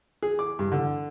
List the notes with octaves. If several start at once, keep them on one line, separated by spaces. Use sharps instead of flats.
G#4
D6
G2
D3